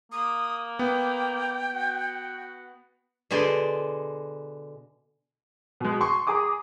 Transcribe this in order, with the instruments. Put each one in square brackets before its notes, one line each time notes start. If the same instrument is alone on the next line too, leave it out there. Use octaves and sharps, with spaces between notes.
[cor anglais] A#3 [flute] D#6
[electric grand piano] B3 [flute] G5
[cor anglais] F#4
[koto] B2 D3 G#4 C5 D5
[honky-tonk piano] B2 G#3
C6 C#6
G#4 A#5 D6 D#6